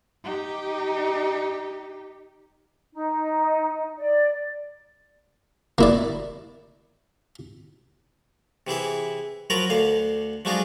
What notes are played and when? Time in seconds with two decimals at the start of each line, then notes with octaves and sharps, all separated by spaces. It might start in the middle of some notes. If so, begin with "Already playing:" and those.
0.24 D#4 G4
2.93 D#4
3.98 D5
5.78 A#3 E4 D5
8.67 C3 E3 E4 G#4
9.50 F3 F#3 F4 A#4 A#5 B5
9.70 D2 D3 F5
10.45 F3 F#3 G#3 D4 D#4 F4